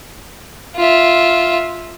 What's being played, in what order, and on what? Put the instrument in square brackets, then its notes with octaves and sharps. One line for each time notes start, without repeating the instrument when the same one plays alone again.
[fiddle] F4 E5